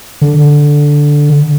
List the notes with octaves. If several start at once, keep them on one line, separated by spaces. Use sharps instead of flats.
D3